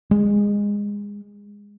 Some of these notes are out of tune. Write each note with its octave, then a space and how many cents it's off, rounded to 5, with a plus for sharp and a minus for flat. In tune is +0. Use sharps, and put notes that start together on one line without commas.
G#3 -20